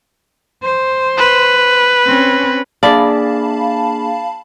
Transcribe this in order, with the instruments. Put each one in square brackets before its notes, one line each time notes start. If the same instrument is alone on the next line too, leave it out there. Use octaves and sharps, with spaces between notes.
[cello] C5
[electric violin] B4
[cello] C4 C#4
[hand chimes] A#3 D4 G#4 [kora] D5 [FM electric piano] F5 A5 B5